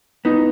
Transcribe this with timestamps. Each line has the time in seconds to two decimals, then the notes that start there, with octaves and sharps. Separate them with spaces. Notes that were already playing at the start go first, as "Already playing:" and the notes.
0.25 B3 D#4